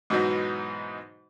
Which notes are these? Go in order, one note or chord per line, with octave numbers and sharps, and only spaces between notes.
G#2 B2 E3 F#3 B3 D#4